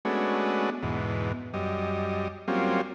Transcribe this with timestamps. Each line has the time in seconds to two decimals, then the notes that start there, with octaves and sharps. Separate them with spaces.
0.05 G#3 A3 B3 C#4 D4 F#4
0.83 E2 G#2 B2
1.54 F#2 G3 D#5
2.48 F#3 G3 A#3 C4 C#4 F4